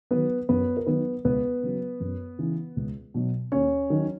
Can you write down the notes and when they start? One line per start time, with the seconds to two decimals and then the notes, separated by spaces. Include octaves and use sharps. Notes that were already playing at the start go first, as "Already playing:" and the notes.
0.11 D#3 F#3 B3 B4
0.49 F#2 B3 B4
0.77 A#4
0.86 D#3 F#3 B3 B4
1.25 C#2 B3 B4
1.63 C#3 F#3
2.00 F#2
2.39 C#3 E3
2.76 C#2
3.14 B2 F#3
3.52 D#2 C#4 C#5
3.90 D#3 F#3